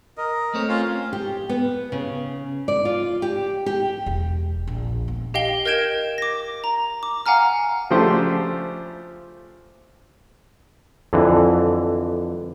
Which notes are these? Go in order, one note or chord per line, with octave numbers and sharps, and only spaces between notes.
A#4 D#5
A3 C4 C#5
C#4 F4 F5
G4
B3
C#3
D5
F4
G4
G4
E1
A#1
B3
G4 D#5 F5 G5 G7
A#4 D#5 G6 G#6 D7 E7
D6 A#6
A#5
D6
F5 F#5 G#5 A#5 F6
C#3 F3 A3 D4 G4 C5
F2 D3 E3